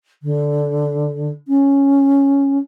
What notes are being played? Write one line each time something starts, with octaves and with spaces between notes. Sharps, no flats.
D3
C#4